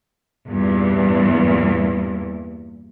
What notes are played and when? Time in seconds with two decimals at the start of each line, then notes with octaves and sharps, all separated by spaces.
0.46 E2 G2 A#2